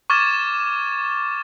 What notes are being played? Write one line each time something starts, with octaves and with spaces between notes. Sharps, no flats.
C#6 D6 F6 G#6 A6 E7